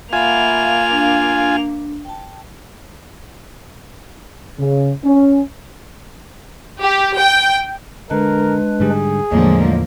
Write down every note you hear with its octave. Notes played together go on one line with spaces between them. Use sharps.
A#3 F4 E5 F#5 G#5 B5 F7
D4
G5 A5
C#3
C#4
G4
G5
D3 G#3 D4 A#4 B4
G#2 D3 G3 G#4
E2 A2 D3 F3 F#3 G#3 A#3